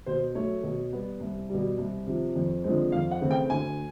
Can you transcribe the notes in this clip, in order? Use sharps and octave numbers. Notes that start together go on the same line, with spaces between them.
B2 C5
F#3 A3 C#5
B2
G3 B3
C2
B2 G3
C2
C3 F3
F2
D3 F3 G#3 C4
F2 F5
F#5
C#3 E3 A3 C4
G5
D2 G#5